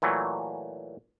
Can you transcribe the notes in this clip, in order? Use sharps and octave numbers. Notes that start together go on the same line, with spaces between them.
A#2 E3 F#3 A3